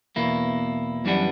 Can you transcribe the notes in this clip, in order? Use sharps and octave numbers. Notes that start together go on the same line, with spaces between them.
E2 B2 A#3 E4
F#2 E3 G3 B3 D4